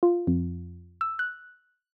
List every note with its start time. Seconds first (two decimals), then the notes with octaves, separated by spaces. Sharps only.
0.03 F4
0.27 F2
1.01 E6
1.19 F#6